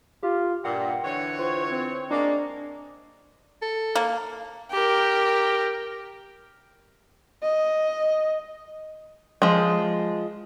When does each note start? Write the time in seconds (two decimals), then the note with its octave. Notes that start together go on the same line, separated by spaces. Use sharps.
0.23 F4 G4
0.65 G2 A#2 F#5 G5
1.05 D3 E3 C#5
1.39 F4 C5
1.71 C4
2.11 G#3 A#3 D4 D5
3.62 A4
3.96 A#3
4.72 G4 A#4
7.43 D#5
9.42 F3 G#3